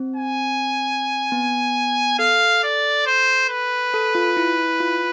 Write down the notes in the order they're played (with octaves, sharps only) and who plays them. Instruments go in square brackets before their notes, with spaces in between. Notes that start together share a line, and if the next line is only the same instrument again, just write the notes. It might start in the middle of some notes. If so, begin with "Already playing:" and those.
Already playing: [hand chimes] C4
[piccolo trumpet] G#5
[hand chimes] B3
[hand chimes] A4 [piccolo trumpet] F5
[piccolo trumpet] D5
C5
B4
[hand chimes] A4
F4
E4
E4
F4